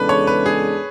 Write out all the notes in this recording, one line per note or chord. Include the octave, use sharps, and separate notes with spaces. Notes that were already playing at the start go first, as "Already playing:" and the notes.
Already playing: E2 C#3 G#3 D4 A4 B4
C#5
B4
G#4